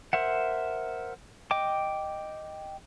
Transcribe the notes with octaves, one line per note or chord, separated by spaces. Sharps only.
A#4 C5 E5 F#5
D#5 G5 D6